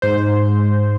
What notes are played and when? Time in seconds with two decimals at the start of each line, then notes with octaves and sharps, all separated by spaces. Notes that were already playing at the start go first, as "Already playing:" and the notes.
0.02 G#2 C5
0.29 G#2